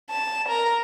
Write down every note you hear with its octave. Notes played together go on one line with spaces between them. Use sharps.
A5
A#4